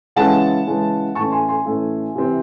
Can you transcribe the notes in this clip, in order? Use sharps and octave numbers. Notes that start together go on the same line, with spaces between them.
C#3 E3 G#3 C#4 F#5 A5
C#3 E3 G#3 C#4
A2 E3 A3 C#4 A5 C#6
G#5 C6
G#5 C6
A2 E3 A3 C#4
C3 E3 C4